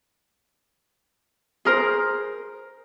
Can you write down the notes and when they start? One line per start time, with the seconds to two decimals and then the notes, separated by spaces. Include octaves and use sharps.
1.65 G#4 A#4 C5